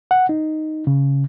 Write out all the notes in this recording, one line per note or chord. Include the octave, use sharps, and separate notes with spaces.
F#5
D#4
C#3